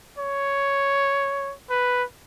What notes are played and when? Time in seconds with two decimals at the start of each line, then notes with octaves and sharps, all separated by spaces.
0.19 C#5
1.70 B4